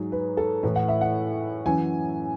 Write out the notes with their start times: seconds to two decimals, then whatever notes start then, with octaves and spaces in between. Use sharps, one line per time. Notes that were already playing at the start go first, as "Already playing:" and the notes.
Already playing: G#2 F#3 G#4
0.12 B4
0.37 A4
0.63 A2 E3 B4
0.76 F#5
0.88 E5
1.01 F#5
1.65 F#2 E3 G#5